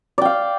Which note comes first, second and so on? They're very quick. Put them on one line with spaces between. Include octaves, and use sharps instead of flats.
D5 G5 F5